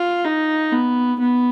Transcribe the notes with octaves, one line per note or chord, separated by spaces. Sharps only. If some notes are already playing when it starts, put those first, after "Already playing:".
Already playing: F4
D#4
B3
B3